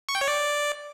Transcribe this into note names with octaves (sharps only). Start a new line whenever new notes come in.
C#6
G5
C#5
D5